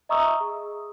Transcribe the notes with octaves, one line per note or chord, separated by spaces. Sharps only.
D#5 E5 A#5 C#6 D#6 E6
G#4